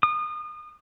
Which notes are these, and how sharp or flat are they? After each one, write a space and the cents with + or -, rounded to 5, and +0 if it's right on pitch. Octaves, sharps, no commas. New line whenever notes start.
D#6 -30